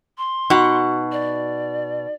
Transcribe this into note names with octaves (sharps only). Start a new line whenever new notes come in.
C6
B2 D#4 F#4 F#5
D5